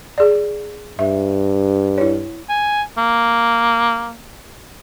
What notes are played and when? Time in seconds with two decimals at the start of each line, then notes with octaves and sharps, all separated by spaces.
0.18 G#4 D5
0.99 G2 E5
1.98 E4 C#5
2.49 G#5
2.98 A#3